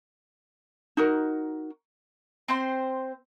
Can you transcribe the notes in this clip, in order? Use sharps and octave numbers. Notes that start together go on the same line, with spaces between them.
D#4 F#4 A#4
C4 C5 C6